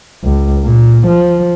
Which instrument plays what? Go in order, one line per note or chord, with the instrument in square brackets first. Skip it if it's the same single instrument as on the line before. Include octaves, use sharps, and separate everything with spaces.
[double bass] C#2
A#2
F3